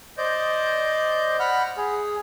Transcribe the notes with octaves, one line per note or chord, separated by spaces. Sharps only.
C5 D5 D#5 G6
F#5 B5 F6
G#4